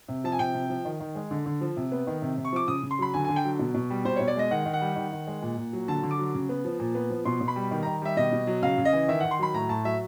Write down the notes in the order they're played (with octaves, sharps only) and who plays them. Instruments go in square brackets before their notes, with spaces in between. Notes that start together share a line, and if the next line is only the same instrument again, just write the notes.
[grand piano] C3
F3 A5
G#5
C3 G5
C3
F3
D#3
D#3
G#3
D3
D3
F3
C3
B3
D#3
C3
C3
C#6
F3 D6
C#3 D#6
C#3
C6
F#3 B5
D3 G#5
D3 G#5
G5
F#3
B2
B2
G3
B2 C5
B2 C#5
D5
G#3 D#5
D#3 F#5
D#3
F#5
G3
D#3
D#3
G#3
A#2
A#2
F#3
D3 A5
D3
D6
F#3
C#3
B3
F3
A#2
B3
F3
B2 C6
B2
B5
G3
D#3
D#3 A#5
G3 E5
B2 D#5
B2
F#3
C#3 F5
C#3
D#5
E3
D#3 E5
D#3 F#5
C6
F#3 B5
A2 A#5
A2 A5
F#3 E5